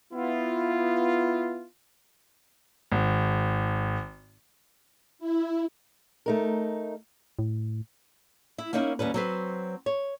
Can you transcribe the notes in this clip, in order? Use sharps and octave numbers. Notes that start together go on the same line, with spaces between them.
B3 E4 F4
G#1
E4
A3 D#4 A#4
A2
E4
A#3 B3 C#4 D#4 E4 A#4
D#2 G3 C#4 B4
F#3 C4 B4
C#5